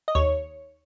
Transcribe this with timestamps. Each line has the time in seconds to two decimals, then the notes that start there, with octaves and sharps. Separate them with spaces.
0.08 D#5
0.15 D#2 C#5